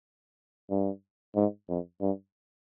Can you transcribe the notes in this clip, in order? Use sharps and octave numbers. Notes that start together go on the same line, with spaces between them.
G2
G#2
F2
G2